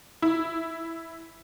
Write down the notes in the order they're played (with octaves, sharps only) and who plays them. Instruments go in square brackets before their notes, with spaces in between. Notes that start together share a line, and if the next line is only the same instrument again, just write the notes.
[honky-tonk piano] E4